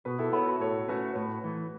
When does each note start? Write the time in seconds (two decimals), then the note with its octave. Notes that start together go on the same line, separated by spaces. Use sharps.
0.05 B2 F#4 B4
0.19 E4 A4
0.33 B3 E4 A4 C#5
0.46 F#4 B4
0.60 A2 A4 C#5
0.88 A3 C#4 F#4 B4
1.12 C#5
1.16 A2 F#4 B4
1.44 E3 A3